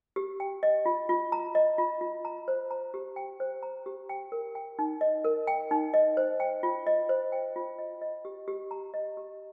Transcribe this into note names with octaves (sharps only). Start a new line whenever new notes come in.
G4
G5
D#5
F4
F4
A#5
D#5
F4
F4
A#5
C5
A#5
G4
G5
C5
A#5
G4
G5
A#4
G5
D#4
D#5
A#4
G5
D#4
D#5
C5
G5
F4
D#5
C5
G5
F4
D#5
D#5
G4
G4
A#5
D#5
G4